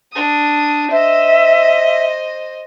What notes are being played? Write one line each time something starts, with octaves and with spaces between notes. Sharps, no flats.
D4 D#6
C5 D#5 E5